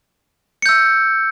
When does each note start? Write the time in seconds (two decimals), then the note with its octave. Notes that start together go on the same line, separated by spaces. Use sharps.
0.62 C#7
0.66 G6
0.69 E6